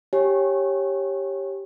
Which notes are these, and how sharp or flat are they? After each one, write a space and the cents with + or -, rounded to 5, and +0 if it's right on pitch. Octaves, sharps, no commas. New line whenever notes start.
G4 +0 C#5 -15 G#5 +0